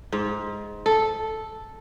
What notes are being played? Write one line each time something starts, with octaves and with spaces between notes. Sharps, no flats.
G#2
A4